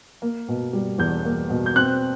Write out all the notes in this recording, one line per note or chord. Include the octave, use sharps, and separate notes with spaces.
A#3
B2
G3
E2 G6
A#3
B2
G6
C4 F#6